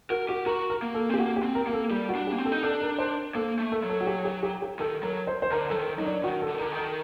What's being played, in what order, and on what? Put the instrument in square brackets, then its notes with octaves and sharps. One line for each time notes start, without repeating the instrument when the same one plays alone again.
[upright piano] F#4 [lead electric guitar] A#4
[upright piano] F#4 [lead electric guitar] G4
[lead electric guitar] F#4 [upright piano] A#4
[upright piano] A#4
[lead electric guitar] A#3
[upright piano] A4
[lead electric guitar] C4
[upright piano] G4
[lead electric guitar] A#3 [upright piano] F#4
[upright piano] G4
[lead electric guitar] C4
[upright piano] A#4
[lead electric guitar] A#3 [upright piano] A#4
[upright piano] A4
[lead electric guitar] G3 [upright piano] G4
[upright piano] F#4
[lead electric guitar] D4
[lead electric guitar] A#3 [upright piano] G4
[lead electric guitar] C4
[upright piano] A4
[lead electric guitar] D#4
[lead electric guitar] D4 [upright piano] A4
[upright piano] A#4
C5
[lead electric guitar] A#3 [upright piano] A4
[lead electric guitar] A3
[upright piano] A4
[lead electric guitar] F#3
[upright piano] A4
F#4
G4
G4
G4
G4
[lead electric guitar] D#3 [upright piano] A4
[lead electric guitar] F#3 [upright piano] A#4
[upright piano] C5
C5
[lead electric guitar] D3 [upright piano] A#4
[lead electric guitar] F#3 [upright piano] A4
[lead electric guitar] D#3
[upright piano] A#4
[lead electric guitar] F#3 [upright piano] D#4
[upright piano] D4
[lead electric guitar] D#3 [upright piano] F#4
[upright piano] A4
[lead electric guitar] D3
D#3
[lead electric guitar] D3 [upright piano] A#4
[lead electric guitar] D#3
[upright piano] A4